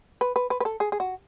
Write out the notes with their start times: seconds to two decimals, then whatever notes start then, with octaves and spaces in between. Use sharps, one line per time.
0.21 B4
0.36 B4
0.50 B4
0.60 B4
0.65 A4
0.80 G#4
0.92 G#4
1.00 F#4